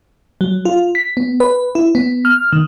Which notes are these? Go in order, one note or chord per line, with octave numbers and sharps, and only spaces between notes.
F#3
F4
B6
B3
B4
E4
B3
F6
D#3